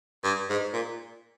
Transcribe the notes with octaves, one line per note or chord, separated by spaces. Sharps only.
G2
G#2
A#2